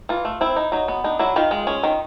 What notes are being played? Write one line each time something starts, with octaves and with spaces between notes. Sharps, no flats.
E3 F4
A3
C4 E4
D#4
F#3 D#4
B3
D4 D#4
F#3 E4
D#3 F4
G#3
C#4
D#3